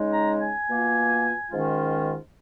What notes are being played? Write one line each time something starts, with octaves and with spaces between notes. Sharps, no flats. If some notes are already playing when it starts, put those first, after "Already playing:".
Already playing: C#3 G#3 D#4
A#5
G#5
B2 A#3 F4
G#2 D#3 G#3 C#4 F4